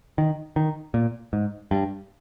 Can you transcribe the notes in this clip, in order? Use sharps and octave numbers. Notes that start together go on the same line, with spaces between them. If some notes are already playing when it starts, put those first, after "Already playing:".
D#3
D#3
A#2
G#2
G2